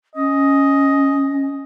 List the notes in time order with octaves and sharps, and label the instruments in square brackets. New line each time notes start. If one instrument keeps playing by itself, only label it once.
[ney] C#4 [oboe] D#5